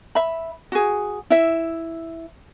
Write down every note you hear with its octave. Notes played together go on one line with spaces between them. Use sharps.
E5 B5
F#4 G#4
E4 E5